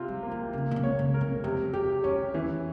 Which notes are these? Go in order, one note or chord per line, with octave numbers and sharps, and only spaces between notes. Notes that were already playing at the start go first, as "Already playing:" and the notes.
Already playing: C3 F4
G3
A#3
E3
C#3 A#3
A#2
C3
C#5
C#3
A#4
C3
F2 C3
F2 G4
F2 C#4
E2 E3